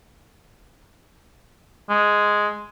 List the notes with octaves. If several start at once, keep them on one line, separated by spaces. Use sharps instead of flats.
G#3